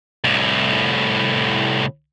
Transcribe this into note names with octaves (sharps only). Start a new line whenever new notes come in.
C2 A2